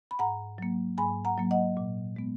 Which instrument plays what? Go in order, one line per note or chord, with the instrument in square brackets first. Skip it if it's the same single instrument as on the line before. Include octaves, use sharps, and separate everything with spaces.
[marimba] B5
G#2 F#5 A#5
F#3 A#3
G#2 G#5 B5
F#5 A#5
F#3 A#3
D#5 F#5
A#2
G#3 B3